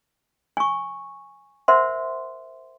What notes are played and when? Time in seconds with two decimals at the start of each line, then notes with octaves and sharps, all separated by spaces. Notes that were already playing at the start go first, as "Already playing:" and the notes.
0.57 G#5 C#6
1.68 A#4 C5 E5 F#5 C6